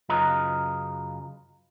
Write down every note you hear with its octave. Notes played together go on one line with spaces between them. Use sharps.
F#2 C#3 F4 B4 D#5 A#5